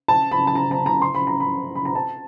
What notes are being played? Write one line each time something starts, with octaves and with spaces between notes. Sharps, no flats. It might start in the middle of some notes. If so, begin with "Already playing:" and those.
A5
B5
A5
A#5
A#5
A#5
C6
B5
A#5
B5
B5
A#5
A5